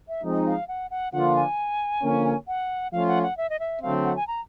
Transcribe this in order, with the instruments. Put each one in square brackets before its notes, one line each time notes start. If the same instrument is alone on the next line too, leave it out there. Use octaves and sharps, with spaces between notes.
[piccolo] E5
[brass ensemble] F3 G#3 C4 D#4
[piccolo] F5
F#5
F#5
[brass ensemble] D3 F3 A#3 D4 F4 [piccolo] F#5
[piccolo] G#5
[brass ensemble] D3 F3 A#3 C#4
[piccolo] F#5
[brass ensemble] F3 A3 C#4 F4 [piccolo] F5
[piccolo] F#5
F#5
E5
D#5
E5
[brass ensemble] D3 F#3 A3 C4 [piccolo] F5
[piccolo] F#5
G#5
A#5